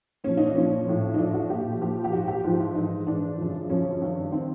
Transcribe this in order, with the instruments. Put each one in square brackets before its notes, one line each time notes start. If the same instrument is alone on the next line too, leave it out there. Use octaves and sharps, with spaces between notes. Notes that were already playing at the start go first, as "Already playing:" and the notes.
[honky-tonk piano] A#2 F3 C#4
D#4
D4
A#2 F3 C#4
A2 F3
D#4
A2 F3 D4
F#4
A#2 F3 G4
A#2 F3 G4
G4
G#2 F3 F#4
G4
G#2 F3 F4
E4
G#2 E3 D#4
G#2 E3 D4
F#2 C#3 F3
F#2 C#3 F3 C#4
G2 D#3
D#3 C4